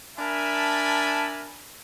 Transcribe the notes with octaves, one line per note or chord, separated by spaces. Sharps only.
D4 A#4 E5 G#5 A5 B5